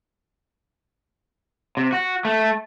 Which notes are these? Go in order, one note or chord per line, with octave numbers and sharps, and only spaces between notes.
C3
F#4
A3